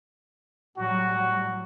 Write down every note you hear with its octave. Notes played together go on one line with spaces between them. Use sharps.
A2 F#3 G3 F#4